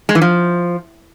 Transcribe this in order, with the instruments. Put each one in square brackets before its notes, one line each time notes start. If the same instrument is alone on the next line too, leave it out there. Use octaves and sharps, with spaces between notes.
[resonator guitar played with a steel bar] G#3
E3
F3